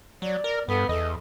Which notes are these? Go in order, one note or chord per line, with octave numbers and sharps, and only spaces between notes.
F#3 D5
A#4
G2 B3 A4
E2 A4 D#5